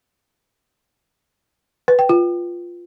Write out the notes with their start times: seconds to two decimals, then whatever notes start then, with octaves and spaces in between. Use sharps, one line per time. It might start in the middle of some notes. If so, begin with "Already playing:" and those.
1.88 B4
1.99 G5
2.09 F4